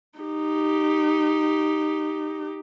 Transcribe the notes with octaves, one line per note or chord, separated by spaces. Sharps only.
D#4 G4